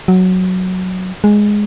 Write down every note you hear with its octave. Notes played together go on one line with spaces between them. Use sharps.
F#3
G#3